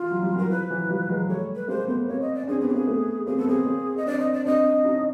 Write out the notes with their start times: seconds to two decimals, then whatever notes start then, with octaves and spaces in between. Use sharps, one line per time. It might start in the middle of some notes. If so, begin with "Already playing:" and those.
Already playing: E3 F4
0.11 F#3
0.22 G3
0.35 E3 F#3 A#4
0.50 F3 B4
0.69 E3 F#3
0.89 F3 G3
1.09 F#3 G#3
1.28 G3 A3 C#5
1.55 B4
1.68 G#3 A#3 C5
1.88 A3 B3 C5
2.08 A#3 C4 C#5
2.21 D#5
2.34 D5
2.43 C#4
2.47 C4 D4 G#4
2.61 B3 C#4 G#4
2.68 G4
2.74 A#3 C4 G#4
2.87 A3 B3
3.26 A#3 C4 G#4
3.38 B3 A4
3.47 A#3 C4 G#4
3.66 A#3 C4
3.97 D#5
4.06 C4 D4 D5
4.19 D#5
4.32 D5
4.46 C4 D4 D#5
4.65 C4 D4
4.85 C#4 D#4